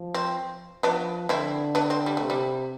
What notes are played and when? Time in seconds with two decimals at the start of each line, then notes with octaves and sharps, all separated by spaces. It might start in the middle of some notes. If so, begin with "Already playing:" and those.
Already playing: F3
0.14 C4
0.83 F3 B3 D4
1.29 D3 C4 E4
1.75 B3 D4
1.90 C4
2.06 G3
2.17 C3 A3
2.30 G3